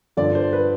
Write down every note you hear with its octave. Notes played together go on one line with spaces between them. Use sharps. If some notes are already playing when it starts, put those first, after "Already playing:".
G2 D3 F3 D5
C5
B4